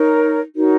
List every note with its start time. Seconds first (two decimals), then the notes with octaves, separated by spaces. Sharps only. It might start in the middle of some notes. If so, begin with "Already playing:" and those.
Already playing: D#4 A#4 C#5
0.54 D#4 F#4 A#4 C#5